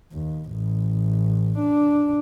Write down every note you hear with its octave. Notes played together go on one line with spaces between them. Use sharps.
D#2
A1
D4